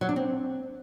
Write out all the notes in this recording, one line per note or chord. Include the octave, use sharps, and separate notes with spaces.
F#3
D4
C4